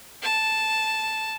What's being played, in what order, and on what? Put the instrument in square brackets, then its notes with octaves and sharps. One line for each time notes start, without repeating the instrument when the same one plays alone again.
[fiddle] A5